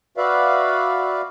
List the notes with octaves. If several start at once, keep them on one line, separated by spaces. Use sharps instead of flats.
F#4 B4 D5 E5 F5